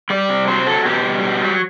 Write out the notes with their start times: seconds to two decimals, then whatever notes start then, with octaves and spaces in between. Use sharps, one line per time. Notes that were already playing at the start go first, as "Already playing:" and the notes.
0.10 G3 D5
0.29 C3
0.48 F#3 C5
0.66 F#3 A4
0.85 B2 G4
1.04 G3
1.23 B2
1.42 F#3